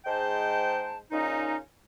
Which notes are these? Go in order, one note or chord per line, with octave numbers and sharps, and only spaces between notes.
G#2 G#3 C5 G5 A5
A#2 C#3 C#4 D#4